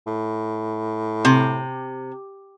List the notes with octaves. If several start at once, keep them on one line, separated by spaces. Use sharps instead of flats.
A2
C3